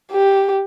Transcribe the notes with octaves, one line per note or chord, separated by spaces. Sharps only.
G4